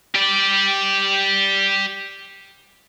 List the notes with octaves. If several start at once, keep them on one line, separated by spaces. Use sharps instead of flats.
G4 D5